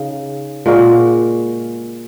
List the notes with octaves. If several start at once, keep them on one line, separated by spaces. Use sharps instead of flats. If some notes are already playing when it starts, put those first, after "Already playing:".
Already playing: C#3 D#4
A#2 G#3 F#4 A#4